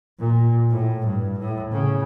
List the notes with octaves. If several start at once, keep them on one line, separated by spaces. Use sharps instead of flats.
A#2
A2
G2
A2
C#3